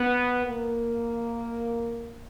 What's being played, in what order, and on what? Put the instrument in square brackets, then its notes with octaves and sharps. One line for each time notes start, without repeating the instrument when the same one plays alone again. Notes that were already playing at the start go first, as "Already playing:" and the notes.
Already playing: [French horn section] B3
A#3